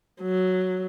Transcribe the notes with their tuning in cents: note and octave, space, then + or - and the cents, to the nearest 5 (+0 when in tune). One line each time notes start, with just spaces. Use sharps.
F#3 +0